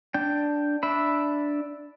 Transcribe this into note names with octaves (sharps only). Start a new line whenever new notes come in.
D4 G5
D4 E5 B5